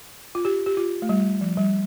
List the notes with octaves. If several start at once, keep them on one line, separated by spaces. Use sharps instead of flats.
F4
G4
G4
F4
A3
G3
F3
G3